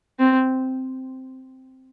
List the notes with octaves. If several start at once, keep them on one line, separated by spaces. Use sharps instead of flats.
C4